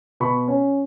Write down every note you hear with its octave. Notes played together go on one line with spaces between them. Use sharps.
B2 B5 C#6
C#4